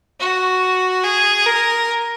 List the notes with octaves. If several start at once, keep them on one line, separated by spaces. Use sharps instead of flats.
F#4
G#4
A#4